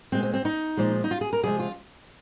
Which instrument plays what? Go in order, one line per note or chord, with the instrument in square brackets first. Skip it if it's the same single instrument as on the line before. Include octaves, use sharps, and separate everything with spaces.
[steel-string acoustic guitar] A#2 G#3 C4
C4
C4
D#4
A#2 F3 G#3
D#4
F4
G#4
A#4
C3 F3 G#3 G#4
F4